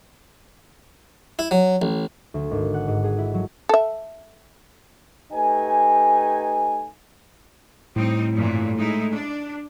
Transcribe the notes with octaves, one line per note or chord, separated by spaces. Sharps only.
E4
F#3
A1
D2
G#1
F#5
G#2
G#4
E4
F#3
A4 E5
A3 D#4 G4 B4 G#5
A2 G3 C4 D#4
G2 A#2 E3
G#3 D#4 E4
D4